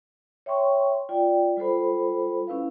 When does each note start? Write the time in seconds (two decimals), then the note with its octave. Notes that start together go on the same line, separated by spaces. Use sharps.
0.46 C#5 E5 G5 C6 C#6
1.09 F4 D5 G5
1.57 G3 F4 A4 C5 B5
2.47 C#4 E4 B4 F5